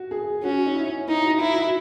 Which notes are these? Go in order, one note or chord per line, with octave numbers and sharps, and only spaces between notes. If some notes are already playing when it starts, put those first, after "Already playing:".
Already playing: F#4
G#4
C#4 F#4
D#4
E4
D#4 E4
F#4
E4 F#4
F#4